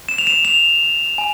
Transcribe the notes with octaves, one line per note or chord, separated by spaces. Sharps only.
E7
F7
E7
F7
G#5